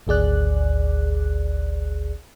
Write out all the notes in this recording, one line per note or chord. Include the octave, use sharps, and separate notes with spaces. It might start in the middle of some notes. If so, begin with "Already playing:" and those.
G#1 D2 G#4 D5 F#6